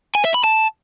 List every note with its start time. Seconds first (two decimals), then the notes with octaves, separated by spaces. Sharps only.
0.15 G#5
0.25 E5
0.34 B5
0.44 A5